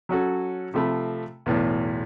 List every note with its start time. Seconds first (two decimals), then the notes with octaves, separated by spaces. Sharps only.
0.09 F#3 C#4 F#4 A4
0.74 C3 F3 A3 B5
1.46 B1 E2 A2